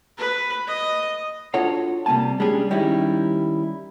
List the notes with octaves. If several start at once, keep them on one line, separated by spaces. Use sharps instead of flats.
B4
D#5
D4 F4 F#4 A4 C#5 F#5
C3 G3 A#3 G#5 A5
G3 G#3 C#4 D4 G#4
D#3 G3 C#4 D#4 E4